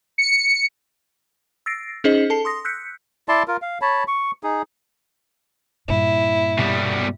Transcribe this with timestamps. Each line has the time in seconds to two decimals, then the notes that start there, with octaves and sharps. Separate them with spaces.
0.18 C#7
1.66 E6 A6 A#6 C7 D7
2.04 C#4 D#4 G#4 C5 D#5
2.30 A4 A5 C7
2.45 C6 D#6 A#6
2.65 E6 F#6 G6 B6 C#7
3.28 E4 D5 A5 C6
3.48 F4 A#4
3.62 F5
3.82 C#5 A5 B5
4.08 C#6
4.43 D#4 G#4
5.88 G2 A#2 E4
6.59 B2 G3